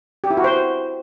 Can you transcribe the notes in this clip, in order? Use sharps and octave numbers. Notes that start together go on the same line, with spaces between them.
G4
E4
F#4
C5